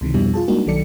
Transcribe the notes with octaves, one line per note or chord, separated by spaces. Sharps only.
C#2 C3 D#3 E3
F2 B2 G3 D4 E4
F4 G#4 A5
G3 G#3 A#3 D4 D#4 F#4
B1 D#3 F#3 A4 D5 C#7